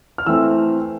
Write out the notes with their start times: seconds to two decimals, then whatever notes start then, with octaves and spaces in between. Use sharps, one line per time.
0.18 F6
0.26 E3 A3 C4 E6